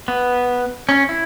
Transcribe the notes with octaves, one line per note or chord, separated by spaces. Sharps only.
B3
C#4
E4